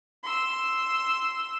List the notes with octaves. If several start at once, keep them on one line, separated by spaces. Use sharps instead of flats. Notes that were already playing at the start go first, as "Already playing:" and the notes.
C6 E6